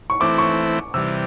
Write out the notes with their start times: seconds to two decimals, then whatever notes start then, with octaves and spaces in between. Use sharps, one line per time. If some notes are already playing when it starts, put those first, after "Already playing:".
0.10 C#6
0.20 E3 A3 C4 E4 D6
0.38 C#6
0.94 C3 E3 G3 E6